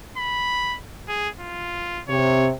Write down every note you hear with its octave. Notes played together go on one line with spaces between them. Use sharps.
B5
G#4
F4
C3 C#5